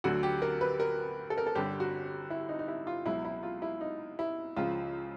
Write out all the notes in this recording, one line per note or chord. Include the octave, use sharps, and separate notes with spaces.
D2 D3 F#3 F#4
G4
A#4
B4
A#4
A4
A#4
A4
G1 G2 D3 G4
F#4
E4
D#4
D#4
E4
F4
C#2 B2 F#3 E4
E4
F4
E4
D#4
E4
C#2 C#3 F3 F4